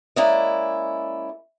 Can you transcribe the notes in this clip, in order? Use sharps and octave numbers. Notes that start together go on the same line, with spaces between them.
G#3 A#3 C#4 E4 D5 D#5